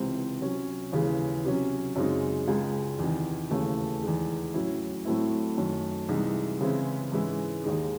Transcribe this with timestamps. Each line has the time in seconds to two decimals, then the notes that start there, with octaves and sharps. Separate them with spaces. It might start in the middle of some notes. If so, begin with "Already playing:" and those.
Already playing: C#2 C3 E3 C4
0.41 C3 F#3 C#4
0.92 D#2 C#3 E3 G#3
1.44 C3 F#3 C#4
1.96 F#2 C#3 G#3 C4 D#4
2.47 C#2 C#3 G#3
2.99 E2 C3 D#3
3.51 D#2 C#3 E3 A3 C#4
4.02 E2 D#3 G#3
4.54 A2 F#3 C#4 E4
5.05 A2 F#3 A3 C4 E4
5.57 F#2 D#3 A3
6.09 C2 C3 E3 G#3 D#4
6.60 C#3 E3 G#3 C4 E4
7.12 G#2 E3 G#3 C#4 E4
7.64 D#2 D#3 G#3 D#4